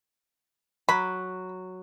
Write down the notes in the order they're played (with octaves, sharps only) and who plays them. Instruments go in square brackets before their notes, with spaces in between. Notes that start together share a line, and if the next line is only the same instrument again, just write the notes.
[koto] F#3 [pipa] B5